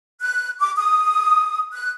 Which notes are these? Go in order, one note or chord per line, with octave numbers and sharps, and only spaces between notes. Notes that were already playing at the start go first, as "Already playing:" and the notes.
F#6
D6
D#6
F#6